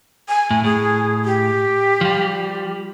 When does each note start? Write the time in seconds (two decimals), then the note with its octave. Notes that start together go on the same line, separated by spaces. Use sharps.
0.29 G#5
0.51 A2
0.64 A2 G#4
1.25 G4
2.01 F3 G3